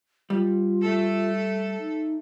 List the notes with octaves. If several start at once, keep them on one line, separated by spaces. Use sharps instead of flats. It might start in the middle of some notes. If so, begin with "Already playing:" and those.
G3 F4
A3 A4
D#4